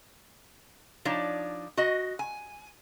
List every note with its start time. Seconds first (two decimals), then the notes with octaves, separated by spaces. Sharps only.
1.05 F3 D4 D#4 C#5 D5
1.77 F#4 D#5
2.19 G#5